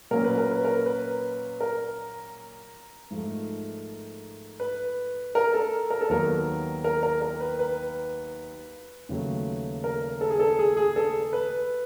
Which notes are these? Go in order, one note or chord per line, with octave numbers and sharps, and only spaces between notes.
A#2 F#3 A#3 C#4 A#4
B4
A#4
B4
A#4
B4
A#4
G#2 F3 A3
B4
A#4
A4
A#4
A4
D#2 D#3 F#3 B3 A#4
A#4
A#4
A#4
B4
B4
D#2 C#3 F#3 A3
A#4
A4
G#4
A4
G#4
G#4
A4
B4